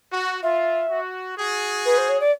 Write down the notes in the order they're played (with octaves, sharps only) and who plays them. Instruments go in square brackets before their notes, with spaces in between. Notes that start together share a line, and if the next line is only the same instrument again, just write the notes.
[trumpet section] F#4
[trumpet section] F4 [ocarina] E5
[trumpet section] F#4
F#4 G#4
[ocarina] B4
C5
C#5
D5